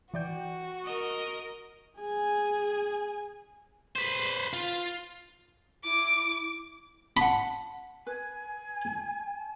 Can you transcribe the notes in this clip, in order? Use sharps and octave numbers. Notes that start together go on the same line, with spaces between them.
E3 F#4 D5 G5
A#4 D#5
G#4 G#5
B4 C5
F4
E4 D6
F#5 A5 B5
B4 G#5